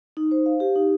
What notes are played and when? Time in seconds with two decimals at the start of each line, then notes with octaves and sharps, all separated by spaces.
0.17 D#4
0.31 C5
0.46 F5
0.60 G4
0.76 D#4